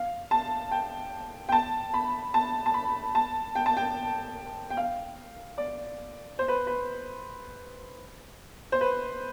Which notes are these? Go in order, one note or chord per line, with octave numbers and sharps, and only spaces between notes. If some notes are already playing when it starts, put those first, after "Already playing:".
Already playing: F5
A5
G5
G5
A5
B5
A5
A5
B5
A5
G5
A5
G5
G5
F5
D5
C5
B4
B4
C5
B4